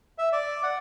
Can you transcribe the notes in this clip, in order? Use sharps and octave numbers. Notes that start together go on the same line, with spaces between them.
E5
D5
F#5